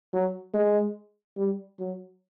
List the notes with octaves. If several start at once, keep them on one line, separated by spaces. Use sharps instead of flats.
F#3
G#3
G3
F#3